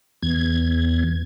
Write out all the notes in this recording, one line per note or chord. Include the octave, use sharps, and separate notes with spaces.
E2 G#6